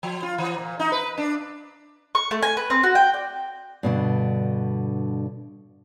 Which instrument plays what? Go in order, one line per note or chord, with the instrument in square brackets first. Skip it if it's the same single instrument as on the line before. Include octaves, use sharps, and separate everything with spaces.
[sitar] F3
F4
E3
A#2
D#4
B4
D4
[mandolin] C#6
A3
G#5
B4
C4
F#4
G5
D5
[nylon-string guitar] G2 B2 D3